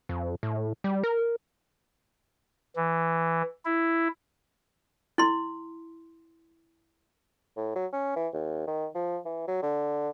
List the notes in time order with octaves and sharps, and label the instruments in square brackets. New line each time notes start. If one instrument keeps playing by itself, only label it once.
[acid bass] F2
A2
G3
A#4
[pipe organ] E3
E4
[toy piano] E4 C6
[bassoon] A2
F#3
C#4
E3
D#2
D#3
F3
E3
F#3
D3